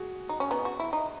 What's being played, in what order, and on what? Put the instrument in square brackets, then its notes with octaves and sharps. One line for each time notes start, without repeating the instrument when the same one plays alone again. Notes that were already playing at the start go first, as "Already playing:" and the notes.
Already playing: [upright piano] F#4 G#4
[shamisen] D#4
C#4
B3 D#4
F#4
E4
D#4